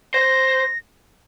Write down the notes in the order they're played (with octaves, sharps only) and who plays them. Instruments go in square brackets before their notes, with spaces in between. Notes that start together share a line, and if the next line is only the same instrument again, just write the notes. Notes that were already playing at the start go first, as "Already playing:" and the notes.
[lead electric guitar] C5 [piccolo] A#6